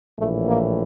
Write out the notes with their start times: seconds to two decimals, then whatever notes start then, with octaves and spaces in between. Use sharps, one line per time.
0.19 A#1 A2 E3 A3
0.48 A#3